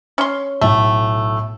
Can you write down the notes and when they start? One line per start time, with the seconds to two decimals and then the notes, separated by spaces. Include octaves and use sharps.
0.18 C#4 C6
0.61 B1 A2 A3